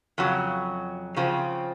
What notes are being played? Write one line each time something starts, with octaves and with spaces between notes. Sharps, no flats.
F2 C#3 F#3
C#3 F3 C4